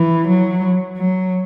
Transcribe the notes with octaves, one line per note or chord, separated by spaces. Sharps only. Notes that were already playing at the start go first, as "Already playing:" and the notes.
Already playing: E3
F#3
F#3